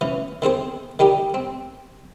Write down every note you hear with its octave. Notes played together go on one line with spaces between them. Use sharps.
E3 C#4
D#3 C4 G#4 C5
D#3 G3 D#4 G4
C4